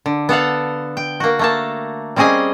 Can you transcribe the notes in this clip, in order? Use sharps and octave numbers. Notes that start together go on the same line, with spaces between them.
D3
B3 A4 F5 F#5
G5
A#3 F#4
A3 A#3 A5
G3 C4 C#4 G#4 D#5 G#5